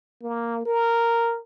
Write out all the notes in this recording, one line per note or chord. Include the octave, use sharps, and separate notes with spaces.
A#3
A#4